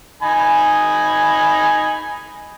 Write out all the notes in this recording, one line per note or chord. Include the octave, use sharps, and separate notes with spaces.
D#4 G#5 B5